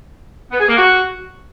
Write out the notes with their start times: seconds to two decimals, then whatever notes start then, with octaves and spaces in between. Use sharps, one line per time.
0.52 B3
0.60 G#4
0.69 A#3
0.77 F#4